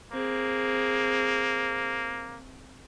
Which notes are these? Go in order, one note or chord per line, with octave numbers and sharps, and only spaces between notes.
A#3 C4 G#4